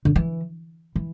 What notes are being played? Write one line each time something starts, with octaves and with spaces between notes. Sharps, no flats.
D3
E3
E3